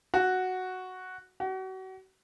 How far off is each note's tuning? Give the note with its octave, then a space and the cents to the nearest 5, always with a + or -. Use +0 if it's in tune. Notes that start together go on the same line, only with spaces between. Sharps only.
F#4 +0
F#4 +35